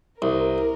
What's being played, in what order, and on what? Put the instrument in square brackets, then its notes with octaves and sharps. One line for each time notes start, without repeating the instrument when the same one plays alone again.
[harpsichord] C2 [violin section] A#4